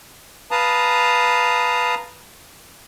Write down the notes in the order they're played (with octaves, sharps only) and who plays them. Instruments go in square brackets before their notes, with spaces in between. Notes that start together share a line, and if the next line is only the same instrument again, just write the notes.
[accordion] B4 F5 A5 A#5 D#6